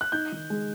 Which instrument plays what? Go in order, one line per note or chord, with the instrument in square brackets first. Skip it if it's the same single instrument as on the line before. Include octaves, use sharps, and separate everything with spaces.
[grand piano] F#6
[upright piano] D#4 [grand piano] G6
[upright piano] D#3
G#3